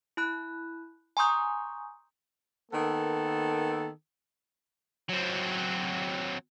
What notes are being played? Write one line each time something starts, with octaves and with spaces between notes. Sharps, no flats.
E4 B5 F#6 G6
G#5 A#5 C6 C#6 D#6 G6
D#3 A#3 B3 A4
F#3 C4